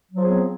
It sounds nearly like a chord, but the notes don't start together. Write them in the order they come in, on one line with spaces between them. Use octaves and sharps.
F#3 F3 G#4 B3 C4